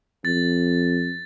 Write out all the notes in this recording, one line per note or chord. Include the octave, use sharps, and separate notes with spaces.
F2 A6